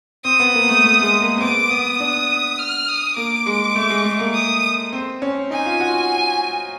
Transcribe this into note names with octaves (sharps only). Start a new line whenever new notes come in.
C4 D#6
B3
A#3
A3
A3
G#3
A#3
C4
B3 D6
B3 D#6
D4
F6
D#6
A#3 D6
G#3
A3
G#3
A3
A#3
D#6
C4
C#4
D#4 G#5
F4
F#4